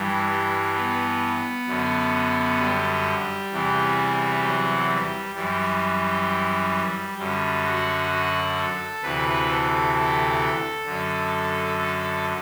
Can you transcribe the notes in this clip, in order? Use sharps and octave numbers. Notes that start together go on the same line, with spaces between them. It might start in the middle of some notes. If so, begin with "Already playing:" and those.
Already playing: G2 E3 G3
G3
B3
F#2 D3
G3
E2 C3 E3
F#3
G3
F#2 E3 G3
F#2 D3 G3
F#4
F#4
A4
D2 C3 E3 B4
A4
A4
F#2 D3
A4